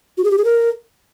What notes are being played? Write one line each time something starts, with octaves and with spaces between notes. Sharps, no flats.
F#4
G#4
G4
G#4
A#4